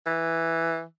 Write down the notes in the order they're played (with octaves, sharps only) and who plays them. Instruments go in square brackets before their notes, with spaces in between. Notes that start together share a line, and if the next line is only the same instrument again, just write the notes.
[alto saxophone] E3